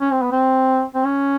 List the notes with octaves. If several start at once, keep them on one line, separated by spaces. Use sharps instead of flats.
C#4
C4
B3
C4
C4
C#4